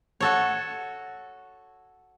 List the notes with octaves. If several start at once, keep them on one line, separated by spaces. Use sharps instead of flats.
F#4 A4 C#5